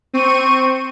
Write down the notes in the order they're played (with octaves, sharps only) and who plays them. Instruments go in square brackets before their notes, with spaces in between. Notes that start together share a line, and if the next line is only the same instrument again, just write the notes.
[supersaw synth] C4 [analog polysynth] C#6 D#7